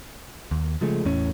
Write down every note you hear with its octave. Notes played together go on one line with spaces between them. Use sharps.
D#2
C#3 F3 G#3 A3
A1 E2 A2 C#4